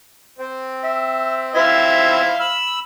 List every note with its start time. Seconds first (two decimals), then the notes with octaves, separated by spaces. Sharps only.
0.39 C4
0.84 E5
1.55 E4 C5 E5 F5
2.40 B5 E6